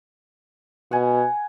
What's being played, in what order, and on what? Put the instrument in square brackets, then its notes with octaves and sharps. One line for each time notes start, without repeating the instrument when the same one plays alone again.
[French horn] B2 [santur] F#5 G#5